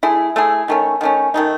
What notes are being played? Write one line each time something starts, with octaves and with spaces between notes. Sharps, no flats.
A3 E4 G#4
A3 E4 G#4
D#3 A3 C#4
D#3 A3 C#4
D#3 A3 D#4